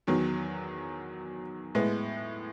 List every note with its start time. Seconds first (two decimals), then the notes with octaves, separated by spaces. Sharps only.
0.07 E2 D#3 F#3
1.75 A2 G#3 B3